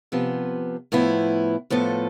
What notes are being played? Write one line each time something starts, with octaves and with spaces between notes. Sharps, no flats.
C3 F3 B3
A2 F3 B3 E4
A2 F3 B3 F4 A4